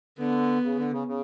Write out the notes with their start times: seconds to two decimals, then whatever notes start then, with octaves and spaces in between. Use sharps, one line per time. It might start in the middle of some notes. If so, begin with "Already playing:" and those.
0.19 D3 B3
0.64 C#3
0.78 D3
0.92 C#3
1.07 C#3